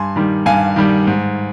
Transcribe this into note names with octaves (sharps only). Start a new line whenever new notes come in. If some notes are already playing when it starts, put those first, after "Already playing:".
Already playing: G2 G#5 C6
D#3 G3
G2 F5 G#5
D#3 G3
G#2